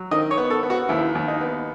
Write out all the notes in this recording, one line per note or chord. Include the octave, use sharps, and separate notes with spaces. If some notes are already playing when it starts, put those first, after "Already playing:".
Already playing: F#3
D#3 D#5
C#5
B3
A4
B3
F#4
D#2 E4
D#2
D#4
B3